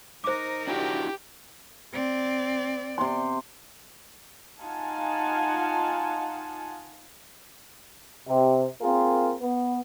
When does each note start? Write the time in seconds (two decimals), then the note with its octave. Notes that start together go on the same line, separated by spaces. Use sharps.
0.24 D#4 A#4 C5 D6
0.67 D4 E4 F#4 G4
1.93 C4 D5
2.98 C3 C6
4.62 D#4 F4 F5 F#5 G#5 A5
8.28 C3
8.81 A#3 C4 F4 G#4 A#4
9.42 B3